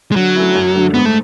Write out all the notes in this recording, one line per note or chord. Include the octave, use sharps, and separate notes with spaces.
G#3
D3 F#3
A3 C#4 E4
F#2
D3 A3 D4
G#2 B3
A3